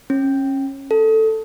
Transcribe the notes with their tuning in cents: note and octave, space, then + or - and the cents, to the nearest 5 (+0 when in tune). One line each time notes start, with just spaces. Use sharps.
C#4 -25
A4 +5